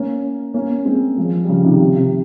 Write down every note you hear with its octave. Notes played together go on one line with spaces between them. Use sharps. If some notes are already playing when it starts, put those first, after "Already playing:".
Already playing: A#3 C#4
A#3 C#4
G#3 C4
F3 G#3
G3
C#3 F3
C3 D#3
C#3
C3
C3